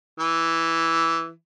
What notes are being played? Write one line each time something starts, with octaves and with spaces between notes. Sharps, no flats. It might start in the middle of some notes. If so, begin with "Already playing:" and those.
E3